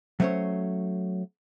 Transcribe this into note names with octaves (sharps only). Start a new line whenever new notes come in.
F#3 A3 B3 C#4 C5 C#5